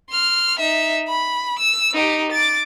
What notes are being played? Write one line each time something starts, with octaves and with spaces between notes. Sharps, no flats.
C6 F6
D#4 E5
B5
E6
D#4 G4
D6 A6